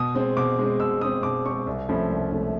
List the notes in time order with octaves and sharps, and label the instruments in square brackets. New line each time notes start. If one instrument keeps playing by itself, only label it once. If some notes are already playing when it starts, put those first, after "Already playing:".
Already playing: [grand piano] B2 D#6
G#3 C4
B2 D6
G#3 C4
B2 E6
G#3 C4 D#6
B2 D6
C4 C#6
G#3
C2
C3 F3 A3 C#4 B5
C2
C3 F3 A3 C#4